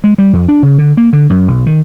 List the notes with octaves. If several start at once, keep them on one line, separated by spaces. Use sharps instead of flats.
G#3
G3
F2
D4
C#3
D3
A#3
D3
F#2
B1
D#3